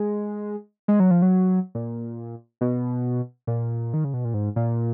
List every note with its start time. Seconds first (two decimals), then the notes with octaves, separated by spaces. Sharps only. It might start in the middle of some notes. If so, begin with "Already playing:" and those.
Already playing: G#3
0.88 G#3
1.00 F#3
1.11 F3
1.22 F#3
1.75 A#2
2.61 B2
3.47 A#2
3.94 D#3
4.04 C#3
4.14 B2
4.25 A#2
4.34 G#2
4.56 A#2